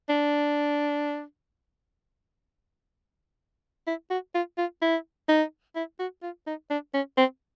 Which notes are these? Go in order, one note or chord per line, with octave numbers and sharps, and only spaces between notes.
D4
E4
F#4
F4
F4
E4
D#4
E4
F#4
F4
D#4
D4
C#4
C4